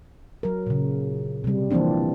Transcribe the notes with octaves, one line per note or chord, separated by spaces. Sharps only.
F#3 A#4
A#2 C#3
C3 G3
E3 F3 A#3 C4 D4